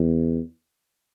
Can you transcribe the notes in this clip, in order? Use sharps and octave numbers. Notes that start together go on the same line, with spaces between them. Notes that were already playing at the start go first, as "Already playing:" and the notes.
Already playing: E2